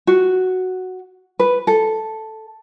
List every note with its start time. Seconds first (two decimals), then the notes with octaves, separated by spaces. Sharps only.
0.07 F#4
1.39 B4
1.67 A4